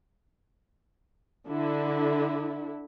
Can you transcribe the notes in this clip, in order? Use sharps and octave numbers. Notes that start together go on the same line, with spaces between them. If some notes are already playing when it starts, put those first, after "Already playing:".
D3 E4